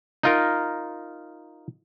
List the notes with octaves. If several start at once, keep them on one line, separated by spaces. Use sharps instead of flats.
D#4 F4 A#4